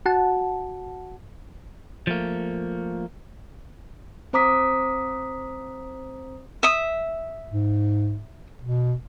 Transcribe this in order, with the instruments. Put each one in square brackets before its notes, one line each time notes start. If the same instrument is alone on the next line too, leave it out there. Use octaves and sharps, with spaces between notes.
[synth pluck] F#4 F#5 A5
[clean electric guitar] F3 A3 A#3
[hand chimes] C4 C5 A#5 D6 D#6 B6
[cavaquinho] E5 D#6
[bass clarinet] G#2
B2